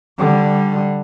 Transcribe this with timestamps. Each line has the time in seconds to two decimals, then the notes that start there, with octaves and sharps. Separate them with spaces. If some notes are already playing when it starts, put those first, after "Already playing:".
0.18 D3 G3